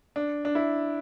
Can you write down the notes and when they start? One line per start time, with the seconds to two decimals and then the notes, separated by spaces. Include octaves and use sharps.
0.16 D4
0.45 D4
0.55 E4